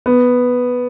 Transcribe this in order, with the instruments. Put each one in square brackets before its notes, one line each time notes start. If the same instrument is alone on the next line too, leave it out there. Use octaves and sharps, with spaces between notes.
[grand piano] B3